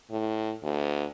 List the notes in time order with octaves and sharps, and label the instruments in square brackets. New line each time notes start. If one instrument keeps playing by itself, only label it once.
[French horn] A2
D2